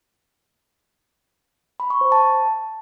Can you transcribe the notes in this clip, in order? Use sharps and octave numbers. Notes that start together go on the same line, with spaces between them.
B5
C#6
C5
A5